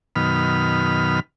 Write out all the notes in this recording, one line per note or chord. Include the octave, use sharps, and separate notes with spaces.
F#2 B2 D#3 B5 F6